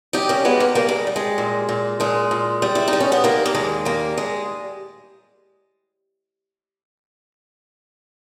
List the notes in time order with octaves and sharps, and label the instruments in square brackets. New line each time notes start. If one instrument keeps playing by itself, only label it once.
[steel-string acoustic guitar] G3 D#4 G4
A#3 C#4
G3 G#3 B3
A#3
G3 A#3
G#3
G3
G#3
A#2
A#2
A#2 G#3
A#2
G3
E4
D#4
G3
C#4
B3
D#2 A#3
A#3
D#2 G#3
G3 A#3
G#3